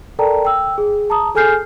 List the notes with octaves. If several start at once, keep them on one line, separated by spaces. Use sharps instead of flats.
A4 A#4 D5 G5 A5 A#5
G5 E6
G#4
A5 A#5 D#6
G#4 A4 G#5 F6 G6 C7